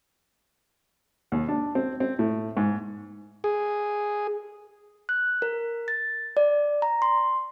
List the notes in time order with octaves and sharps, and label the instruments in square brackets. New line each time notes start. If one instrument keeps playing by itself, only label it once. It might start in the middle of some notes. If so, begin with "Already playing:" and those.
[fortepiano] D#2
D4
C4
C4
A2
G#2
[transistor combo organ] G#4
[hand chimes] F#6
A#4
A6
D5
A#5
C6